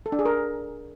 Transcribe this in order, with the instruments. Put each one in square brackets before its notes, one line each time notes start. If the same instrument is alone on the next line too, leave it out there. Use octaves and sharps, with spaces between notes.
[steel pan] A4
D4
G#4
A#4